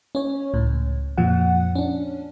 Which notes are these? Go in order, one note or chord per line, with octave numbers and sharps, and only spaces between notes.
C#4 C#5
C#2 A2
F2 A#2 F3 F#5
C#4 D4